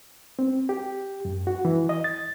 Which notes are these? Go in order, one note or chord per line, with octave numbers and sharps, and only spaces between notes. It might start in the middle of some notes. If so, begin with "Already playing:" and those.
C4
G4
F#2
F#4
E3
D#5
A6